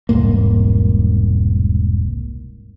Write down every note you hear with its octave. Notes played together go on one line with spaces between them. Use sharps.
E1 C2 G#2 A#3